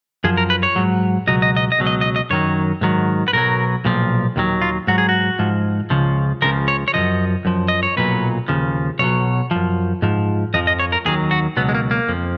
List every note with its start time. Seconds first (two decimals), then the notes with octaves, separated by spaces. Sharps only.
0.24 F#2 F3 G#4
0.37 A#4
0.50 B4
0.63 C#5
0.76 G#2 F#3
1.27 C#2 B2 F#3 D#5
1.42 D#5
1.57 D#5
1.72 D#5
1.79 C#2 B2 F#3
1.87 D#5
2.01 D#5
2.16 D#5
2.30 F#2 D#3 F#3 C#5
2.81 G#2 D#3 F#3
3.28 B4
3.33 B1 B2 F#3 A#4
3.85 B1 A#2 F3
4.36 D#2 D#3 F#3
4.62 F4
4.87 G#2 F#3 F#4
4.98 G#4
5.09 F#4
5.39 G#2 F3
5.90 C#2 C#3 F3
6.42 C#2 C#3 F3 A#4
6.68 C#5
6.88 C#5
6.94 F#2 C#3 F3 D#5
7.45 F#2 F3
7.68 D#5
7.83 C#5
7.97 B1 A#2 F#3 B4
8.48 D#2 C#3 F3
8.99 B1 B2 F#3 C#5
9.51 F#2 F3
10.02 G#2 F3
10.54 F2 F3 D#5
10.67 D#5
10.79 C#5
10.92 A#4
11.05 D#2 D#3 F#3 G#4
11.31 F#4
11.57 C#2 B2 F#3 B3
11.69 G#3
11.75 A#3
11.91 A#3
12.08 F2 F3